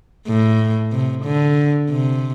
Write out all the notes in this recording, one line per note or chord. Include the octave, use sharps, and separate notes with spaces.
A2
C3
D3
C3